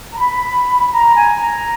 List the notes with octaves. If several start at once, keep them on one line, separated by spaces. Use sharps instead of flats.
A#5
B5
A#5
G#5
A#5